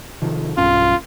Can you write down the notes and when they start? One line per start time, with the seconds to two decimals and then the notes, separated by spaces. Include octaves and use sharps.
0.22 C3 D#3 F3
0.57 B1 G2 C#4 F4